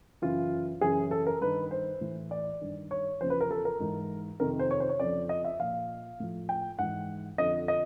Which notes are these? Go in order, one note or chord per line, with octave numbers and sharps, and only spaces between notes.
F#2 C#3 E3 F4
F#2 C#3 E3 G#4
A4
A#4
G2 D#3 B4
C5
A2 E3
D5
G2 D#3
C#5
E2 C#3 F3 C5
B4
A#4
A4
A#4
G#2 E3
F2 C3 D#3 A#4
C5
C#5
C5
C#5
F2 C#3 F3 D5
D#5
E5
A#2 F3 F5
A2 F3
G5
G#2 E3 F#5
F2 D3 F3 D#5
D#5